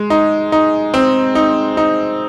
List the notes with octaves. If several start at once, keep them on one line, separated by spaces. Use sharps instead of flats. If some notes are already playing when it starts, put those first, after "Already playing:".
Already playing: G#3
D#4
D#4
C4
D#4
D#4